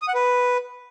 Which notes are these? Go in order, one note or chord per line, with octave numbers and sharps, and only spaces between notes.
D#6
F#5
B4